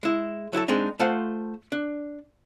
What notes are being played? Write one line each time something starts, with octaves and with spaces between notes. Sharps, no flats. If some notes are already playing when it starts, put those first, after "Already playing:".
G#3 E4
F#3 E4 F#4 A4
G#3 C4 D4 D#4
A3 F4 C5 F5 F#5
D4